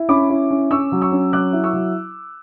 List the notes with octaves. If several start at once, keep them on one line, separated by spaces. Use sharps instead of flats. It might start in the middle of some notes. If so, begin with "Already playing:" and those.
Already playing: E4
C#4 B5 D6
E4
C#4
C#4 C#6 E6
F#3
C#6 E6
C#4
F#3 D6 F#6
E4
C#6 E6
F#3